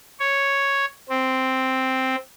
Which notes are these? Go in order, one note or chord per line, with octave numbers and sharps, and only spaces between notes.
C#5
C4